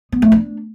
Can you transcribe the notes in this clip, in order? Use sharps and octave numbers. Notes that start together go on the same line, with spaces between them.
B3
A3
D4